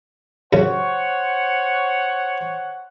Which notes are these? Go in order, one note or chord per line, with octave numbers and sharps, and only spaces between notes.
F#2 C#3 C5 C#5 F#5